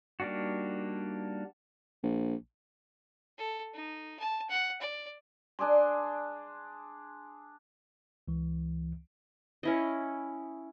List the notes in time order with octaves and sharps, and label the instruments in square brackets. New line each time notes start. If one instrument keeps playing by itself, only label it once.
[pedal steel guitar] G3 A#3 D4 D#4 F#4
[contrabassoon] A#1
[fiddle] A4
D#4
A5
F#5
D5
[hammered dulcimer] D4 G#4 D5 C6
[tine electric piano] C#2 E3
[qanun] C#4 E4 D#5